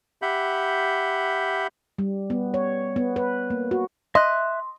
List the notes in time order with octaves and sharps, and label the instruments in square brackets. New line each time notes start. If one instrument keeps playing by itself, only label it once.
[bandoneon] G4 E5 F#5 B5 G6
[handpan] G3
B3
C#5
B3
B4
A#3
F#4
[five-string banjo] D#5 [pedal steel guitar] E5 F#6 [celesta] C6